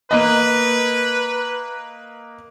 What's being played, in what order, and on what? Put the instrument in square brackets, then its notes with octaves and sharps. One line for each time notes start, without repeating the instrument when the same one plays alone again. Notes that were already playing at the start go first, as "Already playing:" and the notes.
[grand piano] A#3 D#5 [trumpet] B4